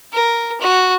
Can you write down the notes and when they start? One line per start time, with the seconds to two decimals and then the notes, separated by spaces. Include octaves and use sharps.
0.14 A#4
0.61 F#4